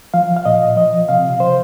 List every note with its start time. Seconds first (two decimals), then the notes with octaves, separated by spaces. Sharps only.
0.14 F3 F5
0.36 F5
0.45 A#2 D#5
0.76 F3 D#5
1.09 C3 F5
1.40 F3 C5